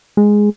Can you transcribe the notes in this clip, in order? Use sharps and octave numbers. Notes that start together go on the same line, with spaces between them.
G#3